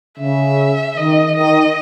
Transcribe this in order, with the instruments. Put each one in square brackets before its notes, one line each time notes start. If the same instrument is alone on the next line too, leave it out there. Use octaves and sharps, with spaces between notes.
[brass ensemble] C#3 [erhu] E5
[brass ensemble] D#3 [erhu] D#5
[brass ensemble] D#3 [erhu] D#5